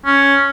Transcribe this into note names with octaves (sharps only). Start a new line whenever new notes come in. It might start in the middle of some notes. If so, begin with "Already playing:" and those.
C#4